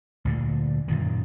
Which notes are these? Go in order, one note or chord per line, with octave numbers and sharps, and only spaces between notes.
D2 A#2 D3
F#2 A#2 D#3